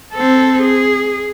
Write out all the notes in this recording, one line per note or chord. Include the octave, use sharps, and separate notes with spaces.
C4 A4
G#4